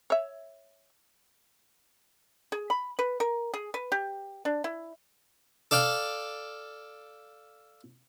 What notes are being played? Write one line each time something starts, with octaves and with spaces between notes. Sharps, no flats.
C#5 E5
G#4
B5
B4
A#4
G#4
B4
G4
D4
E4
A4 D5 F5 G5